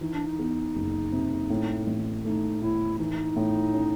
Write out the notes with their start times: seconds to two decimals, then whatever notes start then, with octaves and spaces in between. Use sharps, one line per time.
0.01 E3 D#4
0.14 D4
0.27 D#4
0.39 E2
0.76 F#1
1.12 C3
1.50 A2
1.87 A1
2.24 A3 D#4
2.62 A2 E4
2.99 E3 D#4
3.36 A2
3.73 C#4